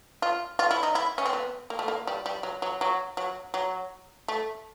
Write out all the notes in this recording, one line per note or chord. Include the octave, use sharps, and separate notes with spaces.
F4
F4
E4
D#4
E4
C#4
C4
B3
A#3
A3
A#3
G3
G3
F#3
F#3
F#3
F#3
F#3
A3